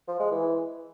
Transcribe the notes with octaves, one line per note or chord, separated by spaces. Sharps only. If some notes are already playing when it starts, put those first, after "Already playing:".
F3
G#3
E3